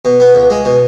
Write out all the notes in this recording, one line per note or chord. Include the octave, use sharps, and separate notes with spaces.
B2
B3
C#2
G#3
B2